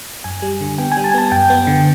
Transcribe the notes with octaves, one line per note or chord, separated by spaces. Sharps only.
F#2 G#5
G3
D3
B3 G5
G3 G#5
A5
G#5
B3 A5
F#2 G5
B3
D3